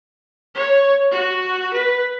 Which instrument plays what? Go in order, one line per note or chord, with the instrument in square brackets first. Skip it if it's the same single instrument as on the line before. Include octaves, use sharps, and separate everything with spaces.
[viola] C#5
F#4
B4